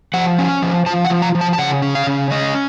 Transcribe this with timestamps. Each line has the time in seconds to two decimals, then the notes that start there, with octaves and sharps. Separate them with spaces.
0.14 F3 F#5
0.38 C#4
0.62 F3
0.86 F3 A5
1.05 F#5
1.10 F3
1.22 A#5
1.35 F3
1.41 A5
1.53 A5
1.58 C#3 F#5
1.82 C#4
1.95 F5
2.07 C#3
2.31 C#4 D#5